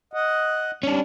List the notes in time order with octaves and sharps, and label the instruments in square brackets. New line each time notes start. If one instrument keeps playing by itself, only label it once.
[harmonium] D#5 F#5
[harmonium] G3 [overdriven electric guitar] C#4 D4